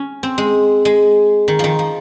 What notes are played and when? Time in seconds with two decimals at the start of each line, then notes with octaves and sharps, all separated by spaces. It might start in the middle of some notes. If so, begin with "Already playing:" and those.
Already playing: C#4
0.23 C4
0.38 G#3
0.85 G#3
1.48 D#3
1.59 D#3 F3
1.79 F3